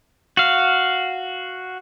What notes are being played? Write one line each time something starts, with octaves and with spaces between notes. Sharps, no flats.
F#4 F5